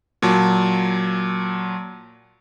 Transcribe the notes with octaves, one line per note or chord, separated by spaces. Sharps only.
A#2 F#3 A5